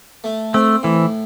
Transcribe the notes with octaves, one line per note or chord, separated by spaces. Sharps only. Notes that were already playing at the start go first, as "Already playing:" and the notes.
A3
A3 C4
A2 E3